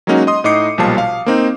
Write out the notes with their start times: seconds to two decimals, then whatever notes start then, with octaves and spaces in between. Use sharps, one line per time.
0.07 F#3 G#3 A#3 C#4 D#4 F#4
0.27 D#5 C6 D#6
0.44 A2 D#4 D#5 D6 C7 C#7
0.78 B1 A#2 F3 G3 A5 C7
0.98 F5
1.26 A#3 C4 D#4